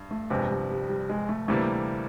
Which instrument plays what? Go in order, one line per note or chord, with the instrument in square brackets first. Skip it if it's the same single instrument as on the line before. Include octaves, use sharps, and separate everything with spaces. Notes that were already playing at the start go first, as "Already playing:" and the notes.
Already playing: [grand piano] G2
[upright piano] A3
[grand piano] G1 F2 C3 [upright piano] G#3
[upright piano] G3
G3
G3
G#3
A3
[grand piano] D2 C3 E3 G3 A#3 [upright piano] A3